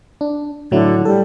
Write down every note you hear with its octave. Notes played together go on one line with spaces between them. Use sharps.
D4
A2 D3 F#3 E4
G3 A4